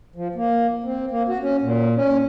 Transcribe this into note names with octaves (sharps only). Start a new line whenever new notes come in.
F3
A#3
C4
A#3
F#4
C#4
A#2
C#4